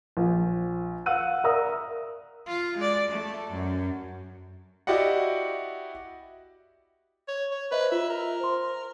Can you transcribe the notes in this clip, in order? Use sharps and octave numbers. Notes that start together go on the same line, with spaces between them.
A#1
F5 F#5 E6 F#6 D#7
A#4 D5 E5 A#5 D#6 E6
F4
G#3 D5
A3
F#2
E4 F#4 G4 D5 D#5 F#5
C#5
C#5
B4 C5 D#5 E5
F4 E5
A#4
C5 C6